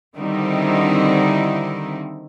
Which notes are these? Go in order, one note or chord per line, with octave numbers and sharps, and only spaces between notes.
D3 D#3 G3 C4 D#4 E4